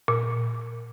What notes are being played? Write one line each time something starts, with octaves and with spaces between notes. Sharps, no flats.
A#2